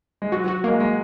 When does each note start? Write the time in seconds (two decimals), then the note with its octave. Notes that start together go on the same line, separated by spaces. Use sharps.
0.22 G#3
0.32 F#3 F#4
0.44 F#3
0.48 F#4
0.64 G#3 A#3
0.80 G#3